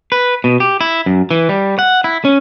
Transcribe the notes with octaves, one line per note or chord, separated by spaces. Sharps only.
B4
B2
G4
E4
F#2
E3
G3
F#5
E4
C#4